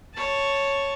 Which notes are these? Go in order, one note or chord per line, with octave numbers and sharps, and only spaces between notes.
C#5 A5